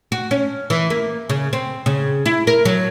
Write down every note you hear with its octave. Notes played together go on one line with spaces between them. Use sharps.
F#4
C#4
E3
A#3
C#3
C4
C#3
E4
A#4
F#3